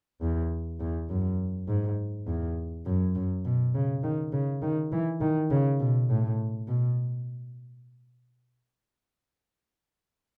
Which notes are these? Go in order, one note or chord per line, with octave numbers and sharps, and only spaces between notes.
E2
E2
F#2
G#2
E2
F#2
F#2
B2
C#3
D#3
C#3
D#3
E3
D#3
C#3
B2
A2
B2